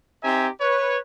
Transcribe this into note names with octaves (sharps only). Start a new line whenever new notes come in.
C4 D#4 G4 E5 G#5 A#5
B4 C#5